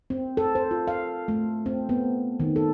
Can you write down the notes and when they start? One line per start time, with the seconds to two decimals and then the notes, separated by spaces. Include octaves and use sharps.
0.10 C4
0.37 A4
0.55 C5
0.71 F4
0.88 F5
1.28 A3
1.66 C4
1.89 B3
2.40 D#3
2.56 A4